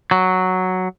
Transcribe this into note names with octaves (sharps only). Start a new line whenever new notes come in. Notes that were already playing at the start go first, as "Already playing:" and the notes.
F#3